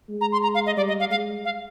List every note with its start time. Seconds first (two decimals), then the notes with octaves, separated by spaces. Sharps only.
0.09 G#3
0.21 A#5
0.32 C6
0.43 A#5
0.55 F5
0.66 D#5
0.77 G3 D5
0.88 D#5
1.00 F5
1.11 G#3 F5
1.45 F5